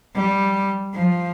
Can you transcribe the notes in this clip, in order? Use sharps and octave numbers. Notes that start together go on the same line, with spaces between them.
G3
F3